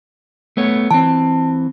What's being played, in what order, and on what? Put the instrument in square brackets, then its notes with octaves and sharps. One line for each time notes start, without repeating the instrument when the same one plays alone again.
[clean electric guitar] A3 B3 C#5
[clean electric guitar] E3 C4 [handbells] A5